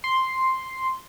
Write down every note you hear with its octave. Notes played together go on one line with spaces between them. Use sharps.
C6